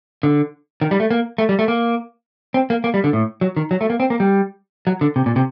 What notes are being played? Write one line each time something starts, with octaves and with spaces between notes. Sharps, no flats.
D3
D#3
G3
A3
A#3
A3
G3
A3
A#3
C4
A#3
A#3
G3
D3
A2
F#3
D#3
F#3
A3
A#3
C4
A#3
G3
F#3
D3
C3
A#2
C3